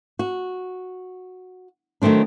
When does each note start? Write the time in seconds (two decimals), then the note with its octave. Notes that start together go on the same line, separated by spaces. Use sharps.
0.19 F#4
2.02 D#3 F#3 A3 C4 D4